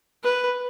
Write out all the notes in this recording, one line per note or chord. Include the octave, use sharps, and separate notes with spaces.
B4